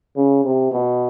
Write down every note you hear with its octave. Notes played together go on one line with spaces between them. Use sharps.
C#3
C3
B2